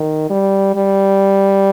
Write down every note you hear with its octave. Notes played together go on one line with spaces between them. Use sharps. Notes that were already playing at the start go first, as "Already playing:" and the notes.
Already playing: D#3
G3
G3